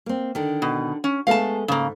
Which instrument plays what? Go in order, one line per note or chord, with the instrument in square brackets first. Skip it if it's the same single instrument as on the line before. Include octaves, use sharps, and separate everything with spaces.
[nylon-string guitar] A#3 C4
D3 D#3
[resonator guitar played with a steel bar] B2
C#4
[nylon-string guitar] G#3 A3 B3 [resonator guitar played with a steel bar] F5 A5
[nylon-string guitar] G#2 [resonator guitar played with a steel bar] C#3 A#3